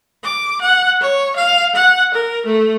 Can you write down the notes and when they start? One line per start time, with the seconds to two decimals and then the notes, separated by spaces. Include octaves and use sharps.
0.24 D6
0.61 F#5
1.01 C#5
1.36 F5
1.75 F#5
2.14 A#4
2.46 A3